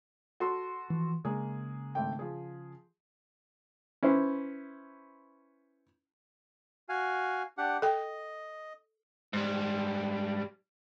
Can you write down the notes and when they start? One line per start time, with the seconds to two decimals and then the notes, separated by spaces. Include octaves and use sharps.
0.40 F#4 A4 C6
0.90 E3 F3
1.25 C#3 G#3 A#3 G#4
1.95 G#1 A3 G5
2.19 F3 G#4
4.03 C#4 E4 B4 C5
6.89 F#4 F5 G#5
7.58 D4 G4 F#5
7.82 A4 D#5 G5
9.33 G#2 G3